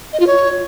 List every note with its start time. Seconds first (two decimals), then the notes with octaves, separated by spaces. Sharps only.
0.13 D#5
0.20 F4
0.27 C#5